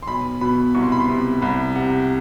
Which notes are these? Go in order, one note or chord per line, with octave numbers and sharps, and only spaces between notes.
C6
B1 B5
B2 B5
C2 C#6
C6
B5
C6
C3
C2 B5
C3 F#5